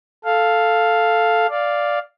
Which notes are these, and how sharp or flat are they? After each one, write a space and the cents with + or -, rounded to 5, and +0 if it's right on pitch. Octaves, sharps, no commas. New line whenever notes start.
A4 +0 F5 +0
D5 +0 F5 +0